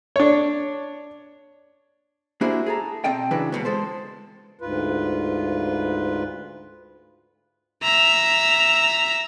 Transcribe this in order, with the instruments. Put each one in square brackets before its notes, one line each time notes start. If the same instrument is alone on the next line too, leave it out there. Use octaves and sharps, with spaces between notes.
[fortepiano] D4 C#5
[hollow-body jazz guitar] A#3 D4 E4 F#4 G#4 C5
G#4 A4 A#5
B2 C4 A4 D#5 G5
C#3 E3 F#3 D4 B4
C#2 B2 B3
G#3 A4 C5
[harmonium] D2 G#2 F4 B4
[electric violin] E5 A#5